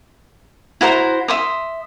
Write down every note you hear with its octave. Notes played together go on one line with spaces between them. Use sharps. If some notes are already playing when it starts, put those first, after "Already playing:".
E4 F#4 C5 A#5
E5 C6 D#6